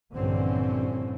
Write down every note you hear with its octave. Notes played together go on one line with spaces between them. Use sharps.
A#1 G2 D3 E3 C4 C#4